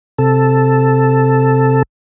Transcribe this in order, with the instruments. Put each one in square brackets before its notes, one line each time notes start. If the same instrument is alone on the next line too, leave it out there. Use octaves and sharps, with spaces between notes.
[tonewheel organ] C3 A4